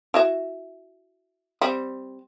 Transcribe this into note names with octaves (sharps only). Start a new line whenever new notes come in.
E4 F#4 E5
G3 C4